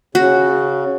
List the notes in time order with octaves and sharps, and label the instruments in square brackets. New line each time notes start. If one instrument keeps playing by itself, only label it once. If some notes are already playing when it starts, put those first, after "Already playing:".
[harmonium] C#3 [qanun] F#4